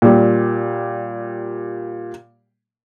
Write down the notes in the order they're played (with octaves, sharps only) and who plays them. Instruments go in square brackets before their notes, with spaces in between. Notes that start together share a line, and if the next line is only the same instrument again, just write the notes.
[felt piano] A#2 G3